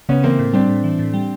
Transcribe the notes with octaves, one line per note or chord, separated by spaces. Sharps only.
C#3 B3 C#4
E3 A#3 C4
A2
G3 C4 D4
A2
E3
A2
G3